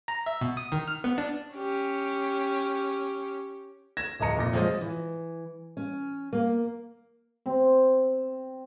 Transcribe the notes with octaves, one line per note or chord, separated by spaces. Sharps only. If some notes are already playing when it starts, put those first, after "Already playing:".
A#5
E5
B2
D#6
D#3
F6
B3
D4
C#4 G4
G#6 A#6 E7
D1 F3 D#5 A#5 C#7
F1 A#2 A#6
F3 G#3 F4 C5 C#5 D#5
E3
C#4
A#3
C4